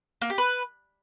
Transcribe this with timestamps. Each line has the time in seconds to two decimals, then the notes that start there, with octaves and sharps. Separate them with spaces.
0.22 A#3
0.30 G4
0.38 B4